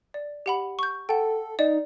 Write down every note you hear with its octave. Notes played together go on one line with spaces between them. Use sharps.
D5
G4 F#5 B5
C#6 G6
A4 F#5 G5
D#4 D5